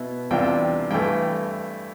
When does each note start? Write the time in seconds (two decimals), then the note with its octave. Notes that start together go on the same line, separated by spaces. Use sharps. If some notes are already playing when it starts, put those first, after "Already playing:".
Already playing: B2 B3 E4
0.31 E2 C3 G3 D4 F4 G5
0.90 G2 E3 A3 G5